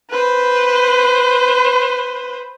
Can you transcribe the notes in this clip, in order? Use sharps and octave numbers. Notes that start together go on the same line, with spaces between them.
B4 C5